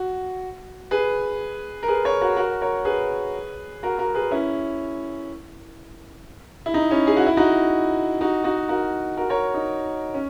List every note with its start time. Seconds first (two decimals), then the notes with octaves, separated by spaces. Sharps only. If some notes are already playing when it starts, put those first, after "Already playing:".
Already playing: F#4
0.91 G#4 B4
1.83 A#4
1.88 G#4 B4
2.05 A#4 C#5
2.21 F#4 A#4
2.36 F#4 A#4
2.61 A#4 C#5
2.85 G#4 B4
3.83 F#4 A#4
3.98 F#4 A#4
4.15 G#4 B4
4.31 C#4 E4
6.66 E4
6.74 D#4
6.91 C#4 E4
7.07 G#4
7.17 F#4
7.27 E4
7.37 D#4 F#4
8.21 D#4 F#4
8.44 D#4 F#4
8.69 F#4 A#4
9.17 F#4 A#4
9.29 A#4 C#5
9.54 D#4
10.14 C#4